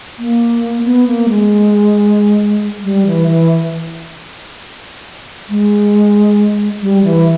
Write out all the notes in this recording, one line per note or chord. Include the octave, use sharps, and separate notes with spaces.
A#3
B3
A#3
G#3
G3
E3
E3
G#3
G3
E3